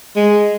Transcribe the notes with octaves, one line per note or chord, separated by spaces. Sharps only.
G#3